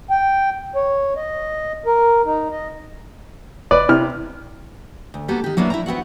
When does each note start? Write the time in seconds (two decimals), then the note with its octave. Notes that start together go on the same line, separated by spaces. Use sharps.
0.10 G5
0.75 C#5
1.16 D#5
1.86 A#4
2.25 D#4
2.51 D#5
3.71 F1 B4 D5
3.89 C3 E4 F6
5.14 D2
5.28 A#3 B3 F#4 G4 A4
5.44 D#3 G4
5.57 F#3 A#3 B3 D4 E4
5.70 E4 G5 A#5
5.86 B3 C4 F#4 F#5